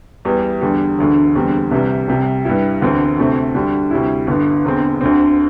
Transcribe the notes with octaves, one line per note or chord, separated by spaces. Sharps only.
E2 E3 G3
E2 D3 G3
E1 D2 D3
E1 E2 D3 G3 C4
C2 C3 E3 G3
C2 C3 G3
G2 G3 E4
E1 D2 D3 C4
D2 C3 A3 C4
D2 D3 G3 D4
D2 C3 G3 E4
G1 G2 D3
E1 E2 D3 C4
D2 D3 C4